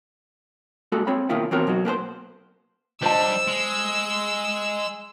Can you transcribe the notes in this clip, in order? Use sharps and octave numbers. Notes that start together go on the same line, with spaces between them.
G#3 A#3 F#4 A4
C4 G#4 C#5 B5
B2 D#3 A#3 E4 F4
E3 B3 C4 F#4 A#4 C#5
B2 F#3 D#4 F4 F#4
A#3 B3 G#4 C5
G3 D4 C5 D#5 A5 E6
G#3